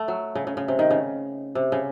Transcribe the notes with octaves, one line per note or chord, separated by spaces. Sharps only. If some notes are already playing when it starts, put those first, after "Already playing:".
Already playing: A3
F#3
C#3
C#3
C#3
C3
D#3
C#3
C3
C#3